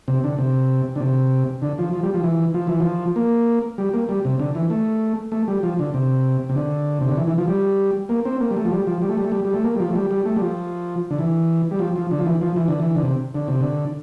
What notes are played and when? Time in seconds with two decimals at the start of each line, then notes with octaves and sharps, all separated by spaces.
0.08 C3
0.24 D3
0.38 C3
0.96 D3
1.00 C3
1.62 D3
1.78 F3
1.93 F3
2.03 G3
2.14 F3
2.24 E3
2.54 F3
2.67 E3
2.80 F3
3.16 A#3
3.78 G3
3.93 A#3
4.09 G3
4.25 C3
4.40 D3
4.55 E3
4.70 A3
5.32 A3
5.48 G3
5.63 F3
5.79 D3
5.94 C3
6.49 C3
6.56 D3
7.01 C3
7.09 D3
7.17 E3
7.27 E3
7.38 F3
7.48 G3
8.09 A#3
8.25 C4
8.40 A#3
8.51 G3
8.57 A3
8.65 F3
8.71 G3
8.87 F3
9.02 G3
9.09 A3
9.17 G3
9.24 A3
9.32 G3
9.45 G3
9.54 A3
9.64 A#3
9.75 G3
9.80 F3
9.89 A3
9.95 G3
10.11 G3
10.25 A3
10.36 G3
10.41 F3
11.11 D3
11.19 E3
11.71 G3
11.79 F3
11.96 F3
12.11 D3
12.19 F3
12.26 E3
12.41 F3
12.56 E3
12.68 D3
12.80 E3
12.95 D3
13.03 C3
13.34 D3
13.48 C3
13.61 D3